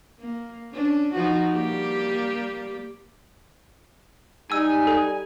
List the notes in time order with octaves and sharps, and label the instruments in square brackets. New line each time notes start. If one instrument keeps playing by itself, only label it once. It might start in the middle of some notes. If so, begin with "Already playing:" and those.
[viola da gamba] A#3
C#4 D4
F3 D#4 F#4
G3 A#3 G4
[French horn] G3 [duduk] D#4 [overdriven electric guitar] G#5 [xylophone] E6
[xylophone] A4